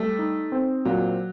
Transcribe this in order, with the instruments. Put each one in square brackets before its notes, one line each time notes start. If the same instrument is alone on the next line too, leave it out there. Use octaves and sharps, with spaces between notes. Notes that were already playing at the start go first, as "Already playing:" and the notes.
Already playing: [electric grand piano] G3 [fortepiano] A3
[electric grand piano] D#4
C4
[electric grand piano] A#2 [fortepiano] F#3